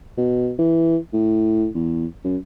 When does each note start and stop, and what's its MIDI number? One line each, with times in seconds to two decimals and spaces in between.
0.18 0.53 47
0.59 0.97 52
1.13 1.67 45
1.75 2.06 40
2.24 2.37 42